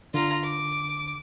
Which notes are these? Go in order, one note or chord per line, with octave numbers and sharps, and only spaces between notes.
D3 F4 A#5
D6